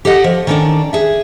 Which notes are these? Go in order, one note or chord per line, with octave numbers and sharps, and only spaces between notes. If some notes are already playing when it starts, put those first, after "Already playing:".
G4 A4 D5 D#5 F#5
F3
D#3 C#4 D4 A4 D5
G#4 E5